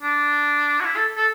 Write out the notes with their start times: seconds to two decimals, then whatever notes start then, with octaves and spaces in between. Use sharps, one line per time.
0.03 D4
0.80 F#4
0.85 E4
0.96 A4
1.17 A4